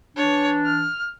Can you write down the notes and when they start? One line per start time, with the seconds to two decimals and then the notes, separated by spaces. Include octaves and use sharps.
0.16 E3 D4 C#5
0.66 F6